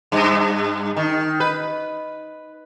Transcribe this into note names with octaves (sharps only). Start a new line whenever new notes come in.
G2
D#3
B4